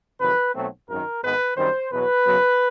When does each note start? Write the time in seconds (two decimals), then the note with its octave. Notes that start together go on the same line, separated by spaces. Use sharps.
0.21 F2 C3 D#3 F#3 B4
0.55 B1 B2 F#3 A3 C4
0.89 G#1 F#2 D#3 A#4
1.23 G#1 G#2 D#3 G#3 B3 B4
1.57 F#2 D#3 G3 C4 C5
1.91 E2 B2 F#3 B4
2.25 F#2 C#3 F#3 B3